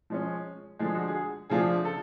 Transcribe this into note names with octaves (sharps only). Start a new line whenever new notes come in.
F3 G#3 C#4
D3 F3 G#3 G#4
F#4
G#4
C#3 F3 A3 D4 F4 G#4
A4